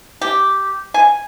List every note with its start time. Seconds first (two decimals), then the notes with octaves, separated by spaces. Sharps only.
0.21 G4
0.94 G#5